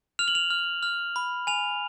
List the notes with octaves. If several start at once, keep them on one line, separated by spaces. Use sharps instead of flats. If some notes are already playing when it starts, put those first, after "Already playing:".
F6 F7
F#7
F7
F6
F6
B5
G#5 F7